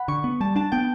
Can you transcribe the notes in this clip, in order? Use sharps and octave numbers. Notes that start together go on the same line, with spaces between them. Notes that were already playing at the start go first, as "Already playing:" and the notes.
Already playing: F#5 B5
D3 C#6
B3
G3 A5
D4 A5
B3 G5